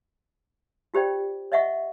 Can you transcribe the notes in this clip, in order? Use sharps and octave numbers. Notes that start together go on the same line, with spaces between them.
F4 G4 C5 D5 G5
C#5 D#5 E5 F#5 C#6